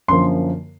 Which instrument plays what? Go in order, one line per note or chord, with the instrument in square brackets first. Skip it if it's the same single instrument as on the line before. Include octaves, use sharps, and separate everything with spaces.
[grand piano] F#2 D3 F3 A#3 C6